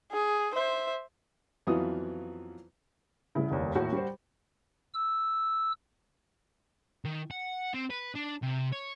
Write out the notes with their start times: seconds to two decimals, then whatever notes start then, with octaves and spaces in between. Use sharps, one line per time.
0.12 G#4
0.54 C5 E5
1.67 F2 E3 F#3 B3 F4 D#6
3.35 C2 C#3 E4
3.51 F1 D#2
3.75 D#2 A2 F#4
3.93 G3 C5
4.94 E6
7.05 D#3
7.31 F#5
7.74 C4
7.90 B4
8.15 D4
8.43 C3
8.73 C#5